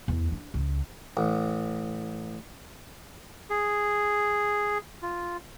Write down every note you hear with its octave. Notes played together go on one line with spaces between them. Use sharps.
E2
D4
C#2
A1
G#4
F4